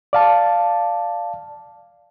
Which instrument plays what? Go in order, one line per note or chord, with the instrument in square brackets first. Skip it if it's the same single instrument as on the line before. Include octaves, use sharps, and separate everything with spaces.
[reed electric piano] D5 F5 A5